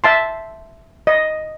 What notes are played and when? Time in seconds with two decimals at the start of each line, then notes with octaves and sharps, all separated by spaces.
0.04 E5 A5 C6
1.07 D#5